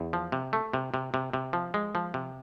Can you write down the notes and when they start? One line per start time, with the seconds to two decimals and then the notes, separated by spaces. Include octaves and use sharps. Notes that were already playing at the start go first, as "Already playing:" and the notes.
Already playing: E2
0.13 F3
0.32 C3
0.53 A3
0.73 C3
0.94 C3
1.14 C3
1.33 C3
1.53 F3
1.74 G#3
1.95 F3
2.14 C3